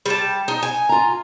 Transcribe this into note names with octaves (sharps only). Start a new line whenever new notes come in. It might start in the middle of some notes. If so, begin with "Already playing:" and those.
G3 A5
D#4
G#5
F4 A#5